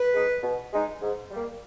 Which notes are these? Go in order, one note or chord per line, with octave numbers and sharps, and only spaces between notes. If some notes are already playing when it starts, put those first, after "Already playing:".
Already playing: B4
G#3 D#4
B2
G#3 D#4
G#2
G3 A#3